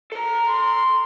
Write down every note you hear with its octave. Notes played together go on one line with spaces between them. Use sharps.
A4 A#5
C6